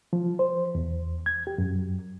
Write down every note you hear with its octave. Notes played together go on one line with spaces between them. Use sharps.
F3
C5
E2
G#6
G4
F#2